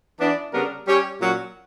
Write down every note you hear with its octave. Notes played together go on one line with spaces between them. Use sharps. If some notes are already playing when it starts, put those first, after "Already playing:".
E3 B3 D4
C#3 G3 B3 D4 A#4
G3 C#4 G4 C#5
A#2 F#3 C#4 F#4